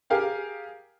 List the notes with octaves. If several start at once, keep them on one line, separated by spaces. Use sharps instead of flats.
G4 G#4 A#4 F5 G5